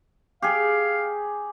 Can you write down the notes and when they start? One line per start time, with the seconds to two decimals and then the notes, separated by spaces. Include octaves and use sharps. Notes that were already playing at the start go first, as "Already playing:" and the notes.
0.42 G4 G#4 F5